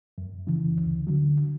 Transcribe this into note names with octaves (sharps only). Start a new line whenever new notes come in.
F#2
C#3 E3
D2
D3 F#3